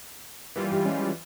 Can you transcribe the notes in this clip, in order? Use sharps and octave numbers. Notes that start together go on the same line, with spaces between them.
E3 G3 A#3 F4
G4
G#3 C#4